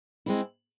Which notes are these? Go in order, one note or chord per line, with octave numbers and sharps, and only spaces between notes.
G#3 C4 E4